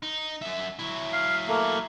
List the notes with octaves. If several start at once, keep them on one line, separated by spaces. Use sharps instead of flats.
D#4
F#2 E5
F#3 E4
F5
A3 A#3